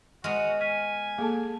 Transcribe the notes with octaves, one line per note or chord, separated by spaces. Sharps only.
G#3 B3 F#4 F6 D#7 F7
G#5 F6 B6 D#7
A#3 G#4 A4 A5